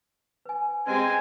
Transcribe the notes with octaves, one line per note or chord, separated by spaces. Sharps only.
B4 G#5
G#3 C4 G4 B4 G#5